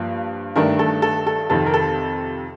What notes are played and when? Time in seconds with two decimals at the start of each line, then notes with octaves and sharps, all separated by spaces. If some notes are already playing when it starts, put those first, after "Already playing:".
Already playing: G2 F3 A#3
0.56 G2 D#3 A3 D4 A#4
0.79 A4
1.02 A4
1.27 A4
1.50 F2 C3 D#3 A4
1.66 A#4
1.74 A4